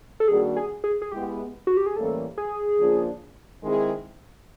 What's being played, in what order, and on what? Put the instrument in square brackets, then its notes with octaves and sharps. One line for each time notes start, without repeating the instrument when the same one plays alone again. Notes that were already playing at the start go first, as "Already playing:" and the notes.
[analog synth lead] A4
[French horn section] D#3 G3 A#3 D4 F#4 [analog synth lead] G#4
[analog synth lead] G#4
G#4
G#4
[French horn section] G#3 B3 E4 [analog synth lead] G4
[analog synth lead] F#4
G4
G#4
[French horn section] A2 E3 G3 A#3 C#4 [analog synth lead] A4
[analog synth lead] G#4
[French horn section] C#3 F3 A#3 D4 F4
D#3 G#3 C4 E4 G#4